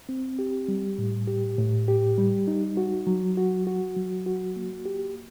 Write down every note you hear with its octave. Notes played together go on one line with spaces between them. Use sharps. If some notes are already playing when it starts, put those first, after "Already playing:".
C4
G4
G3
A2
G4
A2
G4
G3
D#4
F#4
F#3
F#4
F#4
F#3
F#4
A#3
G4